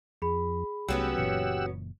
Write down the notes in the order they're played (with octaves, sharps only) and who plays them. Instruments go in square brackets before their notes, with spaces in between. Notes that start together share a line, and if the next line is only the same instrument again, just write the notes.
[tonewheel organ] F2 [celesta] G#4 B5
[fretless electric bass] C2 A3 [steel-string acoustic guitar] F#3 B3 C#4 [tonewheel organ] G4 F#5 E6
[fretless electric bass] F#1 A#2 E3 [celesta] C#7